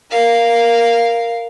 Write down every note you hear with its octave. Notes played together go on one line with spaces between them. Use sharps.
A#4 F5